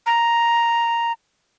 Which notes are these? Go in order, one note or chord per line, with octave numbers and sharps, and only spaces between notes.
A#5